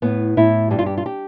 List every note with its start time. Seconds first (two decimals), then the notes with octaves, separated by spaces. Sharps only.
0.02 A2 B3
0.37 A2 E4
0.71 G2 G4
0.79 F4
0.86 G4
0.97 F4
1.06 G4